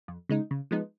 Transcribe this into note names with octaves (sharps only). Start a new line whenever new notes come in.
F2
C#3 G#3 D#4
C#3
F3 G#3 B3 D#4